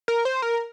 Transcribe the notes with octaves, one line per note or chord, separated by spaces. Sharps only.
A#4
C5
A#4